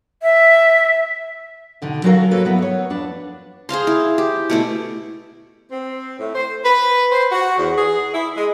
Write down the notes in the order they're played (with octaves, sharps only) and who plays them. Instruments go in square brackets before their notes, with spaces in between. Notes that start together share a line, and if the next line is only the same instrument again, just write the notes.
[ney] E5
[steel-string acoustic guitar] B2 D3 D#3
F#3 C#4 F#4 A4 A#4 F5
A#3 A4 B4 C#5
F#3 B3 E4
B3 C#5
F2 D4 B4
[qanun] G#4 C5 F5 C6
E4
G4
B2 A3 E4
[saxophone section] C4
A2
C5
B4
C5
F#4
E2
G#4
E4
G#3